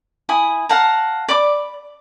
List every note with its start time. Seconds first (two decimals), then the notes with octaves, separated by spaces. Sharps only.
0.29 E4 G#5 B5 D#6
0.69 F5 F#5 A5 A#5
1.28 D5 B5 D6